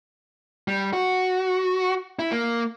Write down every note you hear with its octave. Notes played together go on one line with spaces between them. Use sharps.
G3
F#4
E4
A#3